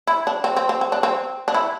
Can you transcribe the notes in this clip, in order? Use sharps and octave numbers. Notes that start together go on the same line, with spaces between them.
E4
D4
C4
C4
C4
C4
D4
C4
D4
E4